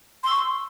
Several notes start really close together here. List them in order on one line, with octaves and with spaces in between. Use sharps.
C6 E6 C#6